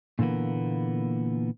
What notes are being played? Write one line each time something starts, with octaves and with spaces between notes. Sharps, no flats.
A#2 D3 E3 A#3 B3